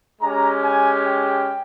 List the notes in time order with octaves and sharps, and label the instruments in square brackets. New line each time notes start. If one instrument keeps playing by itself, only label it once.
[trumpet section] G#3 C#4 G4 A#5
G#5
G5